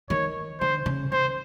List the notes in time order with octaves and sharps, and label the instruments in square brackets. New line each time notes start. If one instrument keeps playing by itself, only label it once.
[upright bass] D#3 [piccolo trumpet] C#5
[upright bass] D3 [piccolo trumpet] C5
[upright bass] C#3
[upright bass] D#3 [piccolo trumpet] C5